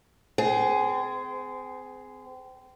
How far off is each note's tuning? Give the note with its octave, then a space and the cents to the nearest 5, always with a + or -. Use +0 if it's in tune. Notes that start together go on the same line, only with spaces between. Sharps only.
C4 -30 G#4 +10